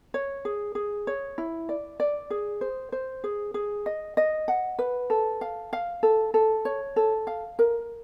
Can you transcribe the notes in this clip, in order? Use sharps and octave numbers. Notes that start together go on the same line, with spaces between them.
C#5
G#4
G#4
C#5
E4
D5
D5
G#4
C5
C5
G#4
G#4
D#5
D#5
F#5
B4
A4
F5
F5
A4
A4
C#5
A4
F5
A#4